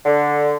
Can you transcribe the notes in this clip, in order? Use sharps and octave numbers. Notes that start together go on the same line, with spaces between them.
D3